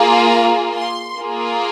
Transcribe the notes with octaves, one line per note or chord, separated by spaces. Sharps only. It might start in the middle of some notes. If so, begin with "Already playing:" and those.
Already playing: A#3 F4 G#4
A#5
C6
A#3 F4 G#4